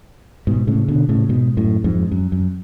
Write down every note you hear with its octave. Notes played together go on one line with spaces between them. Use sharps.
G#2 B2
A2 C#3
B2 D3
A2 C#3
G#2 B2
F#2 A2
F2 G#2
F#2
F#2